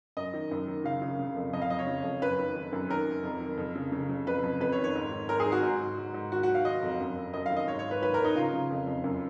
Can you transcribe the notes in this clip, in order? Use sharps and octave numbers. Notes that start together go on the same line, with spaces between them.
F#2 D#5
D#3
F#2
D#3
C#3 F5
C#3
C#3
F2
F2 D#5
F5
F2 D#5
C#5
C#3
F2
F#2 B4
D#3
D#3
F#2
D#3 A#4
D#3
F2
D#3
F2
C#3
C#3
C#3
F2 B4
F2
F2 B4
C#5
D#3
C#5
G#2
D#3
G#2 A#4
G#4
D#3
F#4
G#2
G#2
G#2
G#2
D#3 F#4
F#4
D#3
F5
D#3 D#5
F2
F#2
F#2
F#2 D#5
F5
D#3
D#5
G#2 C#5
C#5
G#2
B4
D#3 B4
A#4
D#3
D#4
C#3 F4
C#3
F2
F2
F#2